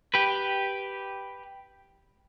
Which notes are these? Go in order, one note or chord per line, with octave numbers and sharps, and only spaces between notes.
G4 B4